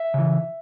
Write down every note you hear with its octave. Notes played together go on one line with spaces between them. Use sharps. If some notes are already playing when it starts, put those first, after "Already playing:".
Already playing: E5
C#3 E3